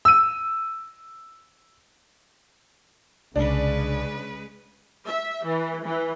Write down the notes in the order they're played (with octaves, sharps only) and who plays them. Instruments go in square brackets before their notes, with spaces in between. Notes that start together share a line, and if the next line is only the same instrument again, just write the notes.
[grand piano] E6 D#7
[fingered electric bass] C2 [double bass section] C#3 [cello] G#3 B4 [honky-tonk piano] D4
[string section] E5
E3
E3